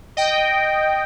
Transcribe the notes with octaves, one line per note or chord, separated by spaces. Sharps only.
D#5 G5